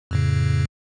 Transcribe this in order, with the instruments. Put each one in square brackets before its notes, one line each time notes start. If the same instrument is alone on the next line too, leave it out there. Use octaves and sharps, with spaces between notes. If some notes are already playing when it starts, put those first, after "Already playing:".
[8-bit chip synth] F2 A2 C#3